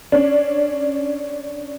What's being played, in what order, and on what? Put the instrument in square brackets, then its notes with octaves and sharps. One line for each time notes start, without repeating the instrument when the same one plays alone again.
[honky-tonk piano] C#4 D4